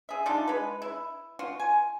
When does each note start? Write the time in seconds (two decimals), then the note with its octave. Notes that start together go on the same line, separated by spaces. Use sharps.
0.09 G#4 E5
0.26 F3 D4 D#4 F4
0.48 G#3 B4
0.82 E4
1.39 F4 F#4
1.60 G#5